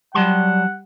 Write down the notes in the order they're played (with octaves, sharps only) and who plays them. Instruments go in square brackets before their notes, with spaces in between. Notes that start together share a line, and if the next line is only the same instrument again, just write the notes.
[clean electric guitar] F#3 A5 C6 [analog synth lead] G3 [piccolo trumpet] F#5